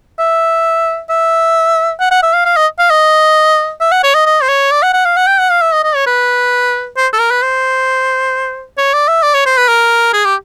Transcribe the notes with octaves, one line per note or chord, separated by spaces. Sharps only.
E5
E5
F#5
F#5
E5
F5
F5
D#5
F5
D#5
E5
F#5
C#5
D#5
D#5
C5
C#5
D5
F#5
F#5
F5
F#5
G5
F#5
F5
E5
D#5
D#5
C#5
B4
C5
A4
A#4
B4
C5
C#5
D5
E5
D5
C#5
C5
B4
A#4
G#4
G4